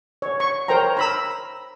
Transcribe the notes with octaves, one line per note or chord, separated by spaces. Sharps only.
C#5
C#6
A#4 C5 C#5 G5 A#5
A#5 B5 E6